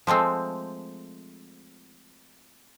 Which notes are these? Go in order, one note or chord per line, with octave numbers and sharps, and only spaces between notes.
F3 G#3 A3 C4